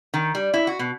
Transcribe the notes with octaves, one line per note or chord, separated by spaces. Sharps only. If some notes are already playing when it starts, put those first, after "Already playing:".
D#3
G3
E4
F#4
B2